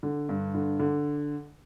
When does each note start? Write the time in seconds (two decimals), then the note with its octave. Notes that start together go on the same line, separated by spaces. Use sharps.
0.03 D3
0.29 G2
0.55 D3
0.79 D3